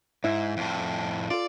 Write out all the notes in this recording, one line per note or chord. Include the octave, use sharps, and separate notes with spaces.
G#2 E4
F2 A2
F4 A4 D5